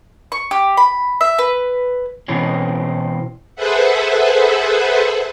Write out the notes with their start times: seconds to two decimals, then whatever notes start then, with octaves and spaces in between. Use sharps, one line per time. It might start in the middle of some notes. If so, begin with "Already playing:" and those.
0.32 C#6
0.51 G4
0.77 B5
1.21 E5
1.39 B4
2.28 B2 E3 C4 C#4
3.56 G#4 A4 B4 C5 E5 F#5